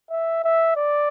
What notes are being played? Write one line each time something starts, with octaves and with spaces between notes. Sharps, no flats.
E5
E5
D5